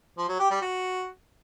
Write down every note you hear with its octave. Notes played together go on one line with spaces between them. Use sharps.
F3
F#3
G4
G3
F#4